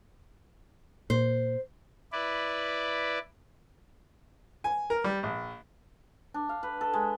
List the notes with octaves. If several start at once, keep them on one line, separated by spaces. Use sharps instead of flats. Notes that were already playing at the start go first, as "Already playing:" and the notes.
A#2 C5
E4 B4 D5
G#5
A#4
G3
A#1
D4
F5
B4
A4
G#3